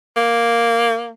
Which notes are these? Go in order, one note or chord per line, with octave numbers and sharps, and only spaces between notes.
A#3